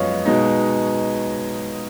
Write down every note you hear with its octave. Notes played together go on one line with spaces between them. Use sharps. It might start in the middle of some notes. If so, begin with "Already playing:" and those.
Already playing: F#2 F3 G#3 B3 C#5 D#5 F5
B2 G#3 D#4